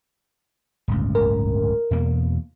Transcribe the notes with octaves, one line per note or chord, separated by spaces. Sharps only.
D1 G1 C#2
A#4
E2 B2 A#3